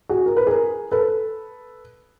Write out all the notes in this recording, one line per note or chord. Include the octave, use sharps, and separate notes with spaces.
F#4 G#4
A#4
B4
G#4 A#4
A4 B4